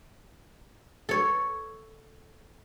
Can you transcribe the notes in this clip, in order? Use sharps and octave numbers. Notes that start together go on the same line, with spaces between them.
A4 C#5